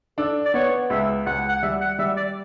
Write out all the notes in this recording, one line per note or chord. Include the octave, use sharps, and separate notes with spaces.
D4 A4
D5
B3 C#5
C#2 E5
C#2 F#5
F#5
G3 E5
F#5
G3 E5
D5